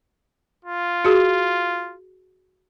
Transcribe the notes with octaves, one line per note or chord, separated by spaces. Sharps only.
F4
F#4 G#4